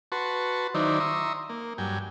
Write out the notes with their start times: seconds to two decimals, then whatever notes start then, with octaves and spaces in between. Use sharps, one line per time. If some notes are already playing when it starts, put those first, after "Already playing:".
0.12 F#4 B4 A5 C6 C#6
0.74 D#3 F#3 D#4 E4 C5 D5
1.00 E5 A#5 C6 C#6 D#6
1.49 A#3
1.78 G2 F#3 G5 G#5